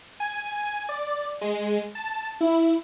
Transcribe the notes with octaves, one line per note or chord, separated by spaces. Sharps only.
G#5
D5
G#3
A5
E4